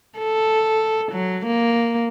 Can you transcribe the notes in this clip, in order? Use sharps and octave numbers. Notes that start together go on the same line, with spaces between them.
A4
F#3
A#3